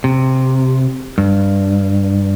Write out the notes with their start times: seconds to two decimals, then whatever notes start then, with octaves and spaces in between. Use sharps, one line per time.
0.04 C3
1.18 G2